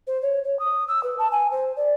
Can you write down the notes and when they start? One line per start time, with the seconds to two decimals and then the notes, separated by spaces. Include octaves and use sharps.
0.07 C5
0.22 C#5
0.44 C#5
0.59 D#6
0.88 E6
1.03 B4
1.19 A5
1.32 G#5
1.51 C5
1.76 D5